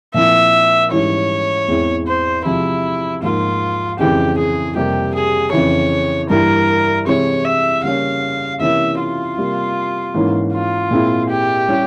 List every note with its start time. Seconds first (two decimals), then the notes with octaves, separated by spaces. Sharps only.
0.14 A#2 F3 C4 E4 E5
0.91 G#2 E3 G3 C#4 E4 C#5
1.68 E2 E3 G#3 C4 E4
2.07 C5
2.45 C3 F3 G#3 E4
3.22 G#2 F3 A#3 F4
3.99 F2 C#3 E3 G#3 C4 G4
4.38 G#4
4.76 F2 C3 G3 A#3 G4
5.14 G#4
5.52 F2 C#3 E3 C#5
6.29 G2 E3 G3 A#3 E4 A#4
7.06 C3 E3 G#3 C4 E4 C#5
7.45 E5
7.83 C#3 G3 A#3 C#4 F5
8.60 C3 E3 A#3 C#4 E4 E5
8.99 F4
9.37 C3 G3 A#3
10.14 G#2 E3 A#3 C#4 E4
10.53 F4
10.91 A#2 G#3 C4 E4
11.29 G4
11.69 G3 C#4 E4